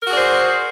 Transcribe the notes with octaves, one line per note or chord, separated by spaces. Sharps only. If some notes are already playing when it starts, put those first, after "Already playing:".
F#4 G#4 A#4 C5 D5